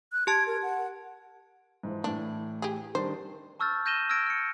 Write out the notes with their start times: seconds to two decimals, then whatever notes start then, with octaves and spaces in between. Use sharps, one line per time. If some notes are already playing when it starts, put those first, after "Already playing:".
0.13 F#6
0.27 G4 A5 G#6
0.47 A#4
0.63 F#5
1.83 G#2 E3 F3
2.04 A2 E3 D4
2.62 G4 G#4
2.95 D#3 G3 D4 C5
3.60 A5 C#6 E6 F6 G6 A6
3.85 F6 G6 A#6 D#7 E7 G7
4.09 E6 F6 G#6 A#6 D7
4.26 F6 C#7